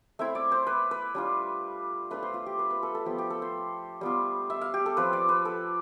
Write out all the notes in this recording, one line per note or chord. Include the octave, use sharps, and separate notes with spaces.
A3 C4 E4 E5
D5
C5
B4
B4
G3 D4 F4
A3 D4 F4 B4
C5
F4
G4
B4
B4
A4
A4
F3 B3 F4 G4
G4
A4
C5
G3 B3 F4
E5
F5
G4
A4
F3 C4 F4 B4
D5
B4
A4